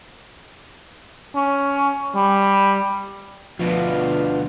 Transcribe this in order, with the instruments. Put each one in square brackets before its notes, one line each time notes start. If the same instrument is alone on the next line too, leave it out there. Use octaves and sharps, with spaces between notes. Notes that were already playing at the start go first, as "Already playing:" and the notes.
[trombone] C#4
G3
[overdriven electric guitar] D2 B2 [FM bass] F3 [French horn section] B3 D4 F4 [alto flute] B4